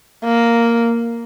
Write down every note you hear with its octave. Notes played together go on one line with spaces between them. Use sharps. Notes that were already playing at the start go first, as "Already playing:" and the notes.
A#3